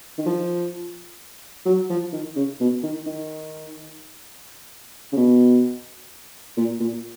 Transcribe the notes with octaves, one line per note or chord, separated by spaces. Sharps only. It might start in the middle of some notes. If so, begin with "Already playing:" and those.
D#3
F3
F#3
F3
D#3
C#3
B2
D#3
D#3
C#3
B2
A#2
A#2